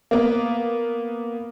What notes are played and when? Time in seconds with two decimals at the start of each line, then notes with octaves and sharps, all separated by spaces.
0.11 A#3 B3